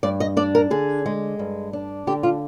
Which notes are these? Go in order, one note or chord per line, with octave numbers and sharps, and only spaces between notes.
G2 D5
D#5
D4 D5
A#4
D3 G#4
G#3
G2
D4
D3 G4
F4